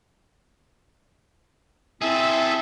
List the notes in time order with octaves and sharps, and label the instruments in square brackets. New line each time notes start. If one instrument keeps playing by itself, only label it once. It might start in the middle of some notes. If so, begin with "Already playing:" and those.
[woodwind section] C4 E4 [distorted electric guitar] G#4 A4 [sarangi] E5